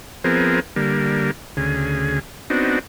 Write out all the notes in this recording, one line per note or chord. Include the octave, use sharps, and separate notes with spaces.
F3 B3 C4 G#4 A#4
D3 G3 A#3
D2 C#3 G#4
B3 C4 D4 D#4 F#4